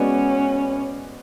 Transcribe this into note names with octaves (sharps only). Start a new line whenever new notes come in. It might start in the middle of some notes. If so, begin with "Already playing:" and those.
Already playing: G#3 B3 C#4 F#4 B4 D5